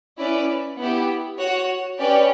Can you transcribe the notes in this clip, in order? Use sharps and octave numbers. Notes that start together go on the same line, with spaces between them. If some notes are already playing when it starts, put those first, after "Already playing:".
C#4 E4 B4 D5
B3 E4 G4
F#4 C#5 F#5
C#4 G4 B4 D5